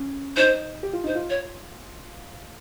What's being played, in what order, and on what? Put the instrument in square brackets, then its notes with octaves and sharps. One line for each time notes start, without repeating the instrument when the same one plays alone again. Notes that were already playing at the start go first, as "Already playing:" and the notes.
Already playing: [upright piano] C#4
[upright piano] D#4 [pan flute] C5
[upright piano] G4
F4
[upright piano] D#4 [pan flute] C5
[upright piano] F4
[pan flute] C#5